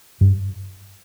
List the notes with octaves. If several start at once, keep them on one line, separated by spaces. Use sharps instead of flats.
G2